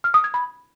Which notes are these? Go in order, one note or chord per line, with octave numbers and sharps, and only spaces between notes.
F6
D#6
G#6
B5